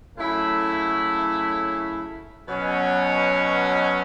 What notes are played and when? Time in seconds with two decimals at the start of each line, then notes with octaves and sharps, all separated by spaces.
0.18 C#3 F#3 A3 E4
2.47 B2 F#3 C#4